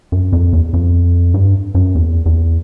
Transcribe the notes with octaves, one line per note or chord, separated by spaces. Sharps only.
F#2
F2
E2
F2
G2
F#2
E2
E2